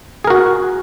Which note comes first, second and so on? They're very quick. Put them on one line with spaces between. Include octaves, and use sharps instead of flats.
G#4 A#4 F#4